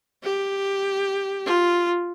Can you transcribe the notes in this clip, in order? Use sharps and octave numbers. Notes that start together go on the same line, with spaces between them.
G4
F4